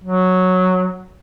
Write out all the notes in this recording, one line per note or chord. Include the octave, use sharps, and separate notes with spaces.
F#3